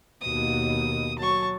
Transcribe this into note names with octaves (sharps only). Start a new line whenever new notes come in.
D#2 B2 D#6
F#3 A5 C#6